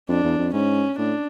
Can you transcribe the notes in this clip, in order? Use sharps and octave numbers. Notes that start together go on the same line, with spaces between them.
F2 D4
E2
F2
G#2 C#4
A2 D4